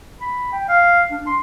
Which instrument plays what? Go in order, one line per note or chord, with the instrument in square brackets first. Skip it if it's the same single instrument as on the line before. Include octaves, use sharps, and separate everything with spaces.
[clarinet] B5
G5
F5
D4
C6